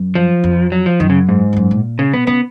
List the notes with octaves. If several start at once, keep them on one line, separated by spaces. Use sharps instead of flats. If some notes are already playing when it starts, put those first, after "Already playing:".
Already playing: F#2
F3
F2
F#3
F3
F#2 D#3
C#3
G#2
F2
F#2
A#2
C#3
B2 B3
C#3 B3